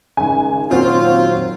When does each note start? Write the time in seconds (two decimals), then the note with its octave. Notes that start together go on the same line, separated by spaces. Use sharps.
0.17 G#1 C#3 G#5
0.71 A#2 D#3 F#3 C4 F4 F#4